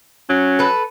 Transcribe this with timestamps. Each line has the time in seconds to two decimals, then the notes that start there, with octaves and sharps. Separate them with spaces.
0.29 F#3 C#4
0.59 A4 B4